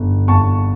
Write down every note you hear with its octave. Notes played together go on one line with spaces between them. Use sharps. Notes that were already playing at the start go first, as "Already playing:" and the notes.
Already playing: G1
G1 A5 C#6